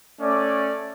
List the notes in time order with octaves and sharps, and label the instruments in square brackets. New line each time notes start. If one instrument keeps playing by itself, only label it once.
[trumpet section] A3 C#4 D5